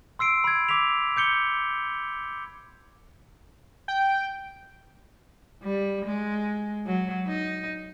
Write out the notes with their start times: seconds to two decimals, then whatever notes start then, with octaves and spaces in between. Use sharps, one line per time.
0.19 C6 E6 C7 D7
0.44 B5 G#6
0.69 D6 E6 B6 F7
1.16 D6 G6 C#7 G7
3.88 G5
5.63 G3
6.05 G#3
6.86 F#3
7.27 D#4